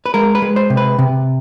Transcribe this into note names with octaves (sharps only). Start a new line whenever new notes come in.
B4
G#3 A#4
B4
G#3
C5
C3
B4
C3